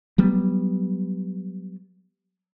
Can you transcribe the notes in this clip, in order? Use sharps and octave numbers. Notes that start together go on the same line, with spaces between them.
F#3 G3 B3